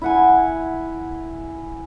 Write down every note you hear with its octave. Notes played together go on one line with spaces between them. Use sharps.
E4 F#5 G#5